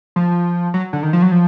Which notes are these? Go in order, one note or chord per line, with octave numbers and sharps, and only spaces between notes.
F3
F#3
D3
D#3
F3
F#3
F3